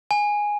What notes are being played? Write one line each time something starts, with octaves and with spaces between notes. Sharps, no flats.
G#5